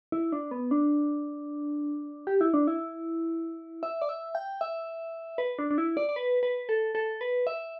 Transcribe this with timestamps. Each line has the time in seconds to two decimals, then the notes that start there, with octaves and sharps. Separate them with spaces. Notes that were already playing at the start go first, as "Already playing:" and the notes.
0.12 E4
0.32 D4
0.51 B3
0.71 D4
2.27 G4
2.41 E4
2.54 D4
2.67 E4
3.83 E5
4.02 D5
4.09 E5
4.35 G5
4.61 E5
5.38 B4
5.59 D4
5.71 D4
5.78 E4
5.97 D5
6.09 D5
6.16 B4
6.43 B4
6.69 A4
6.95 A4
7.21 B4
7.47 E5